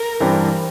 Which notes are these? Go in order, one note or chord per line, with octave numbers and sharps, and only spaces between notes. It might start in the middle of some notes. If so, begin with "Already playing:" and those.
Already playing: A#4
G2 E3 G3 C4